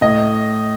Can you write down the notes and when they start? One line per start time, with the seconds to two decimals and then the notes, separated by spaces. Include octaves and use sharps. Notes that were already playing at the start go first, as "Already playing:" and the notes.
0.01 A2 D#5